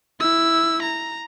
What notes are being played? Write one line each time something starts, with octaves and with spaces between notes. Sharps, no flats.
E4 E6
A#5